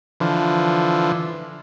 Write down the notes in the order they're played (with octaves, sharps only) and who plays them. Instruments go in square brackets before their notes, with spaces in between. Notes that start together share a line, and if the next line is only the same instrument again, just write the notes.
[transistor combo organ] D3 E3 F3